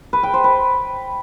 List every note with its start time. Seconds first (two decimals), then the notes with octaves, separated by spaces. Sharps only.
0.13 B4
0.23 G5
0.34 C5
0.44 B4